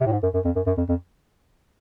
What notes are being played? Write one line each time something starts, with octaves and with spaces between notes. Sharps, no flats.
C3
A2
G#2
F#2
F#2
F2
F#2
F#2
F2
F2